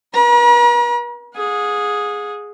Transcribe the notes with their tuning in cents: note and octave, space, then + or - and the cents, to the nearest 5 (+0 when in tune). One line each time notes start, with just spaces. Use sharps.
B4 -45 A#5 +45
G#4 +0 F#5 -45